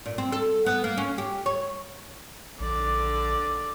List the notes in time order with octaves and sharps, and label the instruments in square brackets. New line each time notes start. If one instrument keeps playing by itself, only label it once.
[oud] A#2
C4
A4
B3
A#3
C#4
G4
C#5
[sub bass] A#1 [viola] D3 D5